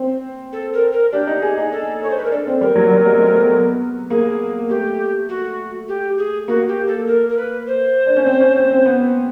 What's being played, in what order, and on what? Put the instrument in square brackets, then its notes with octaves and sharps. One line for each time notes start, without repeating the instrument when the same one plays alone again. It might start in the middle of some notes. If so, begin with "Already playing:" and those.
Already playing: [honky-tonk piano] C4
[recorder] A4
A#4
A#4
[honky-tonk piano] D4 [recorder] G4
[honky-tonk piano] D#4
G#4
D#4
[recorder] A4
C#5
C5
B4
A#4
[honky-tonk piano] D4 [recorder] A4
[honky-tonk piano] C4
[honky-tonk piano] G3 [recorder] A#4
[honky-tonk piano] F#3
G3
G#3
G#3
A3
B3
B3
[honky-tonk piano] A#3 [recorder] G#4
[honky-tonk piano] A3 [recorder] G4
[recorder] F#4
G4
G#4
[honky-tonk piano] A#3 [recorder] F#4
[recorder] G4
A4
A#4
A#4
B4
C5
[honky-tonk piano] D4
C#4
C4
C#4
C#4
C4
B3